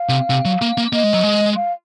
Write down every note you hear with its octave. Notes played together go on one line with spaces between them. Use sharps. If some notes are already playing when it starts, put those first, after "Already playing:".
Already playing: F5
C3
C3
F#3
A#3
A#3
A#3 D#5
G#3
F#3
G#3
F5